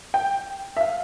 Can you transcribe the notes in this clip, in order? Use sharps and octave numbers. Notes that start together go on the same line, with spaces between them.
G5
E5
F5